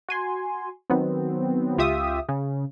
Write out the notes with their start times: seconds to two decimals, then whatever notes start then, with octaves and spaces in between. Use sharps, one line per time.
0.09 F#4 G#5 C6
0.90 D#3 F#3 B3 C4
1.78 C#2 F4 G4 E5 D#6
2.29 C#3